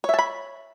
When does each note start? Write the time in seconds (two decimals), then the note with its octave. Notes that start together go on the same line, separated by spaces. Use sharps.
0.04 C#5
0.09 E5
0.14 A5
0.19 B5